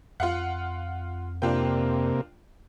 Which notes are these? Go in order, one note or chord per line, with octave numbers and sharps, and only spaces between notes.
F2 F4 F5 F#5
C3 A#3 D4 F4 G5